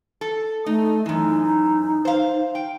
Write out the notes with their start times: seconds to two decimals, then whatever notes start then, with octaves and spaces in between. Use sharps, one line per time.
0.21 A4
0.66 A3 D#4
1.06 F#2 E3 D#4
2.05 C5 F5
2.55 G5